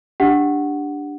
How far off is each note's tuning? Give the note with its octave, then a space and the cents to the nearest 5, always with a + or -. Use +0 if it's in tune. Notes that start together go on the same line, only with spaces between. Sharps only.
D4 +0 G4 +10 F#5 +0